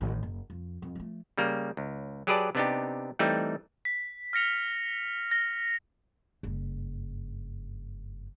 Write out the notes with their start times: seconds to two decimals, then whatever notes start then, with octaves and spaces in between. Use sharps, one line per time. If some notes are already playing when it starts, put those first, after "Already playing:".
0.01 A1 D#3
0.23 F#1
0.50 F2
0.82 F2
0.95 F3 A3
1.37 C#3 G3 A#3
1.77 C#2
2.27 F#3 G4 G#4 B4 D5 A5
2.55 C3 B3 D4 D#4 G4
3.19 E3 G3 A3 C4 D#4
3.85 B6
4.33 F6 A#6 C#7 F7
5.31 A#6
6.43 F#1 G2